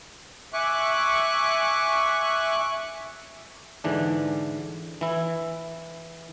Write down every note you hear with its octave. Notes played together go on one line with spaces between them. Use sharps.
E5 G#5 C#6 D6 F#6
G#2 D3 E3 D4
E3 E4